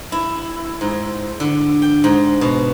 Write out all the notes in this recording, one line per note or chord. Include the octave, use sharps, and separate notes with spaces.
E4
G#2
D3
G5
G#2
B2